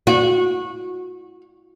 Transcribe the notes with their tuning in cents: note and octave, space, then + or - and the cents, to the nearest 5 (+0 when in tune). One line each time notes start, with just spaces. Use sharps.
F#4 -25